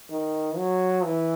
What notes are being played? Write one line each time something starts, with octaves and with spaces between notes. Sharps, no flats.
D#3
F#3
E3